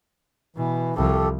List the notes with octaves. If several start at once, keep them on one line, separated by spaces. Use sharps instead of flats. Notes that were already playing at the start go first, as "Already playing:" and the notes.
B2 E3
C2 F3 G4 A4